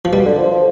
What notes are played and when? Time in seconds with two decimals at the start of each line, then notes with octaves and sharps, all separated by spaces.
0.05 F3
0.12 B2 G3
0.26 D3
0.38 F3
0.51 F3